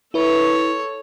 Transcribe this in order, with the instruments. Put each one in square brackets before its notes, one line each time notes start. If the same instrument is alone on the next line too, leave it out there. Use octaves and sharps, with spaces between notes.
[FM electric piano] E4 B4 [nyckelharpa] A4 C#5